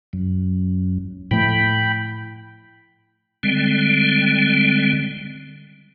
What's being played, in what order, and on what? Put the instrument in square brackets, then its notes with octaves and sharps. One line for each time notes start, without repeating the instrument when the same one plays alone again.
[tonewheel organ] F#2
[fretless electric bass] A2 F3 A3 [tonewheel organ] G5 B5
[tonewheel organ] D3 G3 G#3 C4